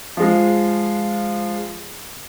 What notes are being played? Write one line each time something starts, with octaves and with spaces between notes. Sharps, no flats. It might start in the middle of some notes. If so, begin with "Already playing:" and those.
F3 G#3